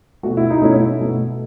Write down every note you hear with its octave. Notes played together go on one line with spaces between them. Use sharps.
B2 A3 F#4
E4
D#4
B2 A3 C#4 E4
B2 A3